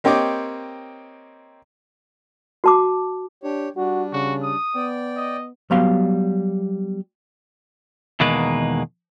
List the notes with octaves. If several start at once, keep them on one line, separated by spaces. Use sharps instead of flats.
A#3 C4 G4 C#5 D#5 D6
F#4 A5 D6
D4 G4 C#5
G3 D4 F#4
C#3 F#4
D#6
B3 D5 G5
D#5
F#3 G3 B3 F5 C6
E2 B2 D#3 G#3 A#3 B4